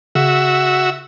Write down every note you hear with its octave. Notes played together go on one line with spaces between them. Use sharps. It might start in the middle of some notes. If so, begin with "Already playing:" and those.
C#3 F#4 E5